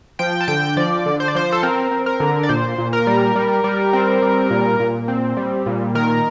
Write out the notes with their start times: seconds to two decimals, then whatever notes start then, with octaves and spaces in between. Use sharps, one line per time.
0.19 F3 G5
0.41 A5
0.48 D3 G5
0.77 F3 D5
1.06 D3
1.20 C5
1.28 D5
1.35 F3 C5
1.52 A4
1.63 C4 A#4
1.91 C4
2.06 A#4
2.20 D3
2.43 D5
2.49 A#2 C5
2.78 A#2
2.93 A#4
3.07 G3
3.36 G3
3.64 G3
3.93 C4
4.22 G3
4.51 A#2
4.80 A#2
5.08 C4
5.37 G3
5.66 A#2
5.95 D#3 A#4